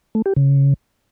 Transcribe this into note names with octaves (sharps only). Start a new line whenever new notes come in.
A3
G4
C#3